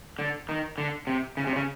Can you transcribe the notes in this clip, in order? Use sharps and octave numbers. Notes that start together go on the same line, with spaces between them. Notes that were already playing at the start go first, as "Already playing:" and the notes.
D3
D#3
D3
C3
C#3
C3
C#3